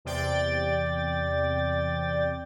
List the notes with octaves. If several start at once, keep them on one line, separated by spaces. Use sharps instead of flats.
E2 C3 D5 G5 A6